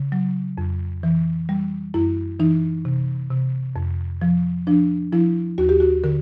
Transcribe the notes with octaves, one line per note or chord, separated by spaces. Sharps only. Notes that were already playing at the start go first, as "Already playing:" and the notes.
Already playing: C#3
F#3
F2
E3
G3
F#2 E4
E3 D#4
C3
C3
F2
F3
F3 D4
F3 E4
D#2 F#4
G4
F#4
D3 A#4